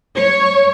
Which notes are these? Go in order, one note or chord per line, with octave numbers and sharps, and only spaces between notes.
C#5